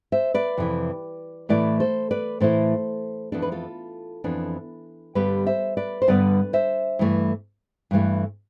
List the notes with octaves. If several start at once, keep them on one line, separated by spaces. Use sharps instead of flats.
C5 E5
B4 D5
F2 C3 E3
A2 E3 A3 E4 B4 D5
A4 C5
B4 D5
A2 E3 A3 E4 A4 C5
F2 E3 B3 D4 A4
B4
F4 A4
F2 E3 B3 D4
G2 D3 G3 B3 G4 B4
C5 E5
B4 D5
C5
G2 D3 G3 B3 B4 D5
C5 E5
G2 E3 A3
G2 E3 A3